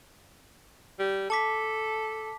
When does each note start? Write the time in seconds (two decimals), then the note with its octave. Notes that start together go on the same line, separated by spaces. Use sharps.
1.00 G3
1.30 A4 A5 D6 B6